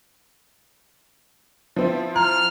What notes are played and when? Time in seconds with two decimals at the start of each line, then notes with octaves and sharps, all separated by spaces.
1.76 F3 C4 E4
2.16 A#5 F6